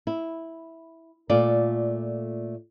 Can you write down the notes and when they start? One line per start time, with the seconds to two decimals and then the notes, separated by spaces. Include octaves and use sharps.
0.07 E4
1.30 A#2 A3 F4 D5